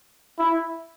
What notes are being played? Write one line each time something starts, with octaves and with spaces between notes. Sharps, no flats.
E4